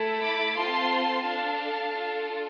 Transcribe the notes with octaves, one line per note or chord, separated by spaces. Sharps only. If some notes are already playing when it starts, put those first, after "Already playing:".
Already playing: A3 E4 A4
B5 D6
C4 F4 A4 A5 C6
D4 A4 F5 A5
D4 F4 A4